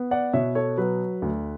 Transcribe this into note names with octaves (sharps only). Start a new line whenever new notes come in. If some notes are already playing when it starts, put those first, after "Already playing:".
Already playing: B3
D5 F#5
B2 C#5 E5
A4 C#5
F#3 B4
D2